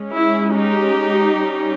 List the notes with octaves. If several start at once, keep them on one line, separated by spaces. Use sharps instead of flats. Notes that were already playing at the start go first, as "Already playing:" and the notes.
Already playing: G#3 C#4
E4
D#4 G4
G3 C#4